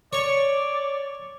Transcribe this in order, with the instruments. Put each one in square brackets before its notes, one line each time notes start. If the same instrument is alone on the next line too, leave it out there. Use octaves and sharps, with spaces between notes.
[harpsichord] C#5 [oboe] D5